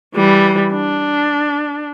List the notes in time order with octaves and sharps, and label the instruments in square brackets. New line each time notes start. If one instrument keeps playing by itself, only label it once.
[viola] E3 G3
D4